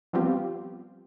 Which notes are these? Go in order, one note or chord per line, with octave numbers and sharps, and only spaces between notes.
F3 G3 B3 C4 F4 G4